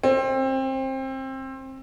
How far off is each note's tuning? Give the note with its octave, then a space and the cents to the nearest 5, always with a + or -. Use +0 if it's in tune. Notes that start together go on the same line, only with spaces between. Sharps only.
C4 +25